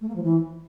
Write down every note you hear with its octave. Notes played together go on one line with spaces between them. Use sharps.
A3
A#3
F3
E3